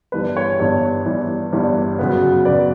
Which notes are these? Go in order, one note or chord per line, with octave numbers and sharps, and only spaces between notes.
G1 G2 E3 G3 B4
C#5
G1 G2 E3 G3 C#5
G1 G2 E3 G3
G1 G2 E3 G3
F#2 C#3 F#3 B3
C#3 F#3 B3 D5